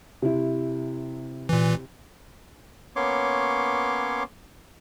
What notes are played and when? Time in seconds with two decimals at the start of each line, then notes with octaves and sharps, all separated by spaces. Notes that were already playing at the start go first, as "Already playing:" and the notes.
0.22 C3 E4
1.49 A#2 E3
2.96 A#3 B3 C#4 C#5 C6 D6